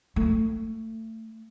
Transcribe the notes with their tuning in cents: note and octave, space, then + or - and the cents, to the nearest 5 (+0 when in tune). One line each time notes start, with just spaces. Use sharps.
A3 +25